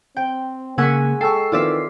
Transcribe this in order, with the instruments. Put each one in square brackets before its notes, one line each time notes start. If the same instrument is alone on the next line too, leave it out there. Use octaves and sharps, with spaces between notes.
[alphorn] C4 [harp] G5
[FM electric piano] C#3 A#3 [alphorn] G#3 [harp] F#5 G#5 C#6 [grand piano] E6 B6
[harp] A4 [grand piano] G5 A5 C#6 [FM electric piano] E6 C7
[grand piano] D#3 E3 C4 [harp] F4 D5 E5